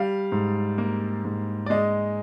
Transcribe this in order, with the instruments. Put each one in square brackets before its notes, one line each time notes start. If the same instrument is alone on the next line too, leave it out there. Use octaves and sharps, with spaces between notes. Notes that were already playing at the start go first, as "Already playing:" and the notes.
Already playing: [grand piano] G3 F5
G#2
A#3
G#2
D5
G#3 D#5